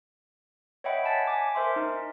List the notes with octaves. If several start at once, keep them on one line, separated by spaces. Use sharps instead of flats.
C#5 D#5 E5 F#5 G5 B5
G#5 A5 A6 B6
G#5 D6
A#4 C5 E5 C6
D#4